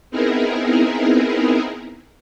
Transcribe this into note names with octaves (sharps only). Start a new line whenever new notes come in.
B3 C4 D#4 E4 G#4 A#4